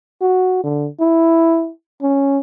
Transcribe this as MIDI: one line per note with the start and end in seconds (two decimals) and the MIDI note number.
0.22 0.59 66
0.64 0.88 50
1.00 1.70 64
2.02 2.39 61